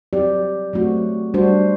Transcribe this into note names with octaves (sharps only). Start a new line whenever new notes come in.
F#3 C4 G4 D5
F#3 A3 C4 F#4
G3 D4 F#4 C5